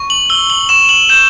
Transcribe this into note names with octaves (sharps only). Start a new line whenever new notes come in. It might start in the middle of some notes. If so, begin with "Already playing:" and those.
Already playing: C#6
F#7
E6 G7
F#7
C#6 E7
F#7
G6 E7